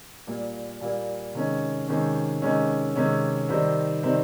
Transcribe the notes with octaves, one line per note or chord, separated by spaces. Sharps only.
A#2 G3 A#3
A#2 G3 A#3
C3 D#3 G#3 C#4
C3 D#3 G#3 C#4
C3 D#3 G#3 C#4
C3 D#3 G#3 C#4
C3 D#3 G3 C4 D#4
C3 D#3 G3 C4 D#4